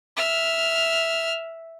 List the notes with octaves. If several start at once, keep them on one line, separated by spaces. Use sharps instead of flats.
E5 F6